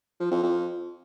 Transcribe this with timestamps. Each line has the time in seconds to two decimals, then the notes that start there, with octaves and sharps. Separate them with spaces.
0.20 F3
0.31 F2
0.43 F2